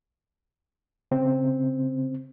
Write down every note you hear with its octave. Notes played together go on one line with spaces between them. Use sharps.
C#3 C4